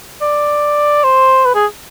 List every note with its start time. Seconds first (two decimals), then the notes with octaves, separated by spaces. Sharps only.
0.22 D5
1.04 C5
1.45 B4
1.55 G#4